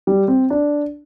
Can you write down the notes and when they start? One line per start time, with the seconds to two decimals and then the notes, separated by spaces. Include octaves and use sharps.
0.07 G3
0.28 C4
0.50 D4